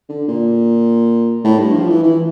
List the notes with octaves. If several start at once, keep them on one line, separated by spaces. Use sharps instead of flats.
D3
A#2
A2
G2
F3
E3
E3